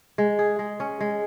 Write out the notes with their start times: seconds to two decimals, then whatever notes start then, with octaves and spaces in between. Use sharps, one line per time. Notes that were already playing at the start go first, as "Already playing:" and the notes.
0.18 G#3
0.39 G#4
0.59 G#3
0.80 C#4
1.00 G#3